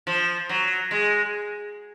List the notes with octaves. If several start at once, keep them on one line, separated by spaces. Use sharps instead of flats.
F3
F#3
G#3